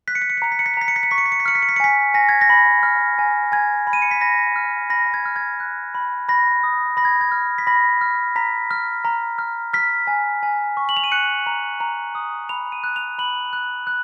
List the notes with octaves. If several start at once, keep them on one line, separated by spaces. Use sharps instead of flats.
F#6 B6
C#7
B6
C#7
B6
A#5 C#7
B6
C#7
B6
C#7
A#5 B6
C#7
B6
C#7
C#6 B6
C#7
B6
C#7
B6
F6 C#7
B6
C#7
B6
C#7
G#5 B6
G#5 A#6
G#6
A#6
B5
F6
G#5
G#5 G#6
B5
D#7
C#7
B6
B5 A#6
F6
B5 A#6
A#6
G#6
F6
G#6
F#6
B5
B5 A#6
D#6
B5 A#6
G#6
G#6
F6
B6
B5 A#6
F6
A#5 B6
F6
A#5
F6
F6 B6
G#5
G#5
C#6
F#7
F7
D#7
F#6 C#7
A#5
A#5
D#6
B5 F7
D#7
F#6
F7
B5 F#7
F#6
F#6